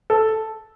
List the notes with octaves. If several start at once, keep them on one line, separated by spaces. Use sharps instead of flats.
A4